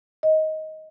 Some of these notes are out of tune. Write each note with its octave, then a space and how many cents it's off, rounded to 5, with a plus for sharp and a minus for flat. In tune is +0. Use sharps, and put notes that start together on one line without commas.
D#5 +15